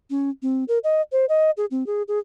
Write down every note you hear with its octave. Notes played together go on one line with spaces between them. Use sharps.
C#4
C4
A#4
D#5
C5
D#5
G#4
C4
G#4
G#4